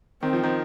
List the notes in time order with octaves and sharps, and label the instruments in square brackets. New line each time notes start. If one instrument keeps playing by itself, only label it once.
[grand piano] D#3 [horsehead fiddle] C4
[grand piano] F3
D#3